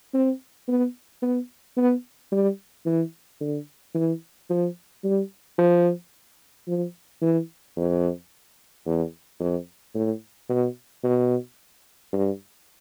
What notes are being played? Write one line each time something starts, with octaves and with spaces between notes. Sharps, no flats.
C4
B3
B3
B3
G3
E3
D3
E3
F3
G3
F3
F3
E3
F2
E2
F2
A2
B2
B2
G2